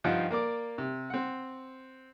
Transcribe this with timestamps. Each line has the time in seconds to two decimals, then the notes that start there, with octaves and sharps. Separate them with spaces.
0.04 G2 F3 D#4 F4 F#5 G5
0.31 A#3 A#4 D5 D6
0.78 C3
1.10 C4 F#5